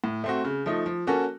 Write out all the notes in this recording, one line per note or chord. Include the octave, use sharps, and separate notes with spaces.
A2
A3 C4 F#4
C#3
F3 A3 D#4
F3
A#3 C#4 F#4 A4